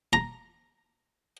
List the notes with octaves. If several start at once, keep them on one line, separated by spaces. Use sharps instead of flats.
A#5